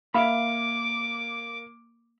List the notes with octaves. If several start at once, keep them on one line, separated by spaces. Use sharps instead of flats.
A#3 E5 F5 B5 D6